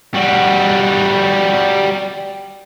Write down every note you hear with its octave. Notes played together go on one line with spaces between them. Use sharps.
G3 F#4